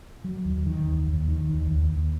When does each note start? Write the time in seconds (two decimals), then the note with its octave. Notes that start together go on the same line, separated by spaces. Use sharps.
0.24 F#3
0.45 D#2
0.66 D#3
0.87 D#2
1.08 D#2
1.28 D#3
1.49 D#2
1.71 D#2
1.91 D#2